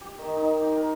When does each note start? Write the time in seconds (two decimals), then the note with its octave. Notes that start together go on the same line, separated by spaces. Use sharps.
0.01 G4
0.18 D#3
0.37 D#4
0.61 G4
0.77 A#4